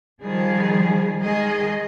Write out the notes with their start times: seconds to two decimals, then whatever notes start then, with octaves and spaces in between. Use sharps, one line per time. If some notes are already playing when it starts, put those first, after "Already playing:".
0.21 D#3 F3 G3 G#4
1.20 D#3 G#3 G#4 D#5